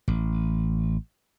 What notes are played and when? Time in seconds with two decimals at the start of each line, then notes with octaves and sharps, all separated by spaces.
0.08 A1